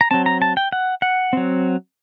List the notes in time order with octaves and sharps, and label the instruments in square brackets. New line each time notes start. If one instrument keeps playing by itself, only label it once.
[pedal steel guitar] A#5
F#3 C4 A5
A#5
A5
G5
F#5
F#5
F#3 C4